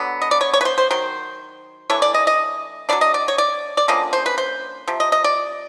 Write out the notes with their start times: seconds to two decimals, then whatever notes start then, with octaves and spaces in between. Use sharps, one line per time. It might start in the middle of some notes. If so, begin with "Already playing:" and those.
Already playing: D3 F#3 B3
0.22 D#5
0.31 D5
0.41 C#5
0.53 C#5
0.61 B4
0.65 C5
0.78 C5
0.91 D#3 F#3 C5
1.90 E3 A3 D4 C#5
2.02 D5
2.14 D#5
2.27 D#5
2.89 F#3 B3 D4 D5
3.01 D#5
3.14 D5
3.28 C#5
3.38 D5
3.77 D5
3.88 D3 F3 A#3 C#4 D#5
4.13 C5
4.26 B4
4.38 C5
4.88 C3 F3
5.00 D#5
5.12 D#5
5.24 D5